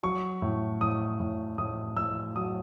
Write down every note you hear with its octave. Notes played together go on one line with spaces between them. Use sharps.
F#3 C#6
A2
A2 D#6
A2
A2 D#6
A2 E6
F#3 D#6